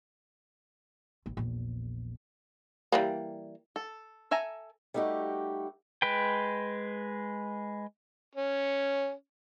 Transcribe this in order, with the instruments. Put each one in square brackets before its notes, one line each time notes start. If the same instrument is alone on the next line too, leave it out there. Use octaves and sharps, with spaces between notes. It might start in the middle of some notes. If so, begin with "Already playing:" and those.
[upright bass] A1
A#1 E2
[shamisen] E3 G3 A#3
[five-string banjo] A4
A4 E5 G#5 A#5
[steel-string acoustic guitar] G3 A3 D#4 F#4 G4
[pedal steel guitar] G#3 B4 G5
[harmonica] C#4